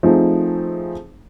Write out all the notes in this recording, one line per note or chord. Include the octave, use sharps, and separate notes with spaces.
F3 A3 C4 D#4 G#4